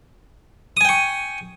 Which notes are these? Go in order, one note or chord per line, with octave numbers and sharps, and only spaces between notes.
G5 G#5 C#6 D#6